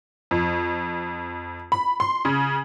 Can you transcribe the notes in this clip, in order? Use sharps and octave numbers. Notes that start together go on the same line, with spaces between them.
F2
B5
C6
C#3